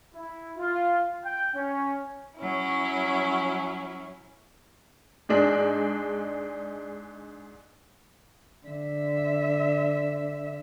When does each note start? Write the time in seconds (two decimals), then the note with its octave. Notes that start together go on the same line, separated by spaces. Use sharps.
0.14 E4
0.57 F4
1.24 G5
1.55 C#4
2.38 F#3 C#4 E4
5.29 G#2 G#3 D4
8.66 D3 E5